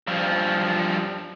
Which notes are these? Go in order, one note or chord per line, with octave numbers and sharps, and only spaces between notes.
G2 F3